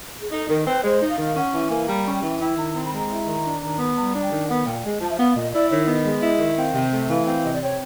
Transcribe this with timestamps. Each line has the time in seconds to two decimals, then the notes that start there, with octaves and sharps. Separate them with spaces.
0.21 G#4
0.32 D#4 A4
0.49 D#3 A#4
0.62 A#4
0.66 C4 B4
0.83 G#3 C5
1.01 D#4
1.09 F5
1.18 D#3
1.36 C#4 F#5
1.53 E3
1.70 A#3 G#5
1.87 G3 A#5
2.06 C#4 G#5
2.14 G5
2.23 E3
2.40 E4 G5
2.57 D#3 A#5
2.74 C4 A#5
2.85 B5
2.93 G#3 A#5
3.10 E4
3.27 D#3
3.45 D4
3.62 D#3
3.79 B3
3.96 G3 A#5
4.15 D4
4.23 G5
4.32 D#3
4.48 B3 F#5
4.66 A#2 G5
4.84 G#3
5.01 F3 A5
5.10 E5
5.19 B3 F5
5.35 A#2 D#5
5.53 E4 D5
5.70 D#3 C#5
5.87 B3 D#5
6.05 G#3
6.22 E4
6.40 D#3
6.58 C4 F5
6.74 C3
6.93 A3
7.09 E3 F5
7.26 C4 F5
7.44 C3 D#5
7.54 D5
7.62 C4 C#5